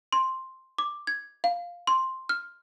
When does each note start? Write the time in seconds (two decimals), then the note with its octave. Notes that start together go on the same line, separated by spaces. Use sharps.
0.13 C6
0.78 D6
1.07 G#6
1.44 F5
1.87 C6
2.29 F6